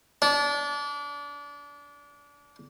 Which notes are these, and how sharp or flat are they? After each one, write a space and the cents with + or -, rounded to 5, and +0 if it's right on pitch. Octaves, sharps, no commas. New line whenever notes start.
D4 -30